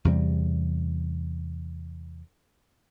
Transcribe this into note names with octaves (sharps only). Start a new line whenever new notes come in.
E2 C3 G3